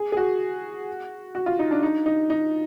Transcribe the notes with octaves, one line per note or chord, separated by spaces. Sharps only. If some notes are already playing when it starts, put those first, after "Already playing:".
Already playing: G#4
G#4
F#4
F#4
F4
D#4
D4
D#4
D#4
D#4